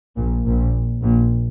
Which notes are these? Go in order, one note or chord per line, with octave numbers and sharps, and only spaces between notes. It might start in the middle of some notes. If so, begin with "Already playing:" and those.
A#1 A#2
A#1 A#2
A#1 A#2